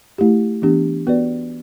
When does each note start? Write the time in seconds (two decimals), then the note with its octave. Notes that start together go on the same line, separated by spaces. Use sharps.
0.18 A3 E4 G4
0.62 E3 B3 D4 G4
1.07 B3 F#4 B4 D5